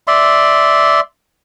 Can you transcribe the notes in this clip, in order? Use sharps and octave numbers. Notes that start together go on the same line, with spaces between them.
D5 E5 C6